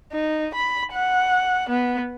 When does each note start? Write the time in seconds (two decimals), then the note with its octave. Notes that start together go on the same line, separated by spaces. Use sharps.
0.12 D#4
0.54 B5
0.92 F#5
1.69 B3